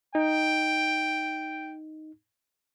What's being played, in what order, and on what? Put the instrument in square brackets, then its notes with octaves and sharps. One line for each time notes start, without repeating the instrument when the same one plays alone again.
[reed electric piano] D#4 [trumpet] G5